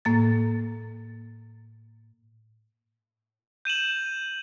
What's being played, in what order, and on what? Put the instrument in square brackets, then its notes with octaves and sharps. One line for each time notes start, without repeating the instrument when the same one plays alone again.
[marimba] A2 A#3 A6
[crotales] G6 D#7 E7 F#7